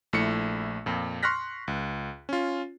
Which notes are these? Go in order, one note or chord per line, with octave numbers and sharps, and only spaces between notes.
A#1 A3 E4 C#7
F2 A#2
C6 C#6 F6 F#6 A#6 B6
C#2
C#4 F4